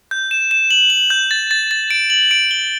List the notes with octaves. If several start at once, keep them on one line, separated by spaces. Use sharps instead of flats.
G6
E7
E7
F#7
F#7
G6
A6
A6
A6
D7
F#7
D7
G7